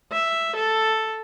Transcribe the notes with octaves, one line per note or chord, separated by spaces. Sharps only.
E5
A4